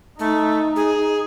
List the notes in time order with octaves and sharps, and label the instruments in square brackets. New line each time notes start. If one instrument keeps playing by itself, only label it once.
[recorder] A3 [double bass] D#4
[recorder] G#4